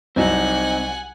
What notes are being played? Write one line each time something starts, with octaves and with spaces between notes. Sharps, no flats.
C2 F#3 C4 D#4 F#5 G#5